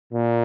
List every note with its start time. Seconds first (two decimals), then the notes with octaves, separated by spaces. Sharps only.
0.13 A#2